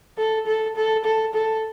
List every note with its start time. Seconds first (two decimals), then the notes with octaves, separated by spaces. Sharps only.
0.18 A4
0.46 A4
0.76 A4
1.05 A4
1.34 A4